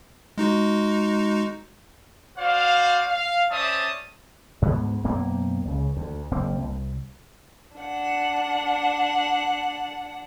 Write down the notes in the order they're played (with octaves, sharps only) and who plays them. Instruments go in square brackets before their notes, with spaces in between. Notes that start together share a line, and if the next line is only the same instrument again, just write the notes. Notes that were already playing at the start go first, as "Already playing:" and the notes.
[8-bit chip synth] G#3 D#4 F#4
[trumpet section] F#4 C5 D5 F5
F5
C#4 C5 D5 E5 A5 D#6
[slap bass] D2 G#2 B3
F#2 B2 A#3 C4
C#2 C#3
D2
F#1 A#3 C4
C2
[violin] D4 F#5